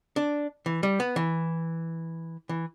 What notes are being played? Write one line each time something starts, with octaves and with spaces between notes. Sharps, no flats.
D4
E3
G3
B3
E3
E3